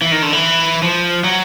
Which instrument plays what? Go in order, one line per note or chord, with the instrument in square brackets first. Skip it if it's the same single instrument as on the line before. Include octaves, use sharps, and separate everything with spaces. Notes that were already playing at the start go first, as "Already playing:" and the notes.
[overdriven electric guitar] E3
D#3
D3
E3
F3
F#3